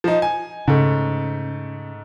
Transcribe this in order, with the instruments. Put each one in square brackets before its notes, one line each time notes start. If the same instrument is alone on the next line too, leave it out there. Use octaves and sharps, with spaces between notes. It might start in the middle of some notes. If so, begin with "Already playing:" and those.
[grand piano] F3 D#4
G#5
[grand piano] G#2 A3 [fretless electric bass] C#3